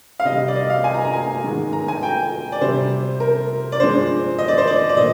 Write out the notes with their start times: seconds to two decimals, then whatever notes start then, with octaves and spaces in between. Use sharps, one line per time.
0.20 F5
0.25 C3 G3 D#5
0.48 D5
0.55 D#5
0.70 F5
0.84 G#5
0.94 A#5
1.05 A#5
1.13 G#5
1.44 G#2 D#3 G#3
1.73 A#5
1.88 G#5
2.03 G5
2.52 D5
2.61 C3 G3 C5
3.20 A#4
3.72 D5
3.80 G2 F3 G#3 C5
4.39 D#5
4.48 D5
4.58 C5
4.67 D5
4.89 D5
4.96 A#2 D#5